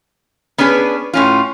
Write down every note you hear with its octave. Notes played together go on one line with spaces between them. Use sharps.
B3 C#4 D4 G#4 B4
A2 C#4 F4